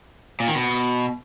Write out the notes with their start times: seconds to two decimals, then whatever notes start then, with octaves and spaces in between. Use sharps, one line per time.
0.40 A#2
0.48 D#3
0.55 B2